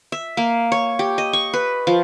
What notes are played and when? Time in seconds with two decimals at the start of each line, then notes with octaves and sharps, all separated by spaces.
0.12 E5
0.37 A#3
0.72 C#5
0.99 G4
1.18 D#5
1.33 C#6
1.53 B4
1.87 F3